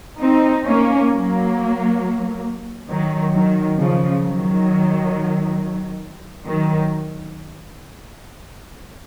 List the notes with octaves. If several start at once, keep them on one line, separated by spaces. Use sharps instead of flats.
C4 D#4
A#3 C#4
F#3 A#3
D#3 F#3
D#3 F#3
C#3 F3
D#3 F#3
D#3 F#3